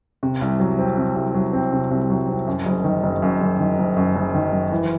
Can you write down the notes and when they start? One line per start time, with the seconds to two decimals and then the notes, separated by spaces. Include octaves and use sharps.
0.23 C3
0.42 C2
0.60 F#3
0.79 C4
0.97 C3
1.16 C2
1.34 F#3
1.53 C4
1.73 C3
1.91 C2
2.10 F#3
2.29 C4
2.47 F#2
2.66 F#1
2.84 D#3
3.03 F#1
3.22 F#2
3.41 F#1
3.60 D#3
3.79 F#1
3.96 F#2
4.16 F#1
4.35 D#3
4.52 F#1
4.71 E3